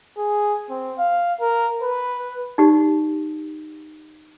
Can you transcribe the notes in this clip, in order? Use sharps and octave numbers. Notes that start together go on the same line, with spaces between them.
G#4
C4
F5
A#4
B4
D#4 G4 D5